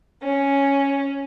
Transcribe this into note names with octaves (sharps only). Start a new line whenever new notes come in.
C#4